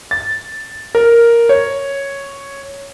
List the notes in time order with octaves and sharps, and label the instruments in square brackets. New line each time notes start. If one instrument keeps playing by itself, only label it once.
[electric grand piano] A6
A#4
C#5